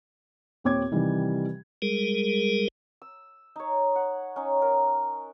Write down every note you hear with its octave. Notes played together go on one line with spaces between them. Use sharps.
D#2 A#2 C4 C#5 D6 G#6
C3 D#3 E3 G3 G4
G3 G#3 G#4 A#4
E6
D#4 C#5
F#5
C#4 D#4
A#4